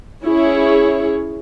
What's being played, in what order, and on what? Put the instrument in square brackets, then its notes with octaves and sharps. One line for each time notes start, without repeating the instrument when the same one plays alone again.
[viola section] C#4 E4 G#4 C#5